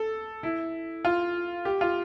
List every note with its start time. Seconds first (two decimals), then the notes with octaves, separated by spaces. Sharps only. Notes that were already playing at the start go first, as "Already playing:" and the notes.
Already playing: A4
0.43 E4
1.05 F4
1.65 G4
1.81 F4